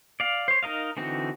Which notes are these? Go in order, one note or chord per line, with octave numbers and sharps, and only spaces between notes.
D5 F5
C5 C#5
D#4 A#4 D#5 F5
D3 E3 C4 D#4 F#4